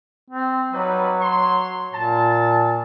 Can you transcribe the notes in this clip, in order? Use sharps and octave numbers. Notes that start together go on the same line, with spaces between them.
C4
F#3 G3 D#4 B4
F#4 C#5 C6
A#2 A5